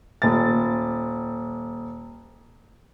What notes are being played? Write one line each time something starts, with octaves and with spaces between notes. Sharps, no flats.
D#1 A6